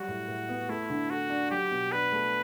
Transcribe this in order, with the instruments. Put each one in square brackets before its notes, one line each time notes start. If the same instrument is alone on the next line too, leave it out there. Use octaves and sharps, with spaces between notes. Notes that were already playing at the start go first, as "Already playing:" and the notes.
Already playing: [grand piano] F#3 G3 [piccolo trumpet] F#4
[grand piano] A2
A2
B3
[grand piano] A3 [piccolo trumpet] E4
[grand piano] D3
[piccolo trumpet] F#4 [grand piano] A4
[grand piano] D4
[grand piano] F#3 [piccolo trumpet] G4
[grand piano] B2
[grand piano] D4 [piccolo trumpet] B4
[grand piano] A3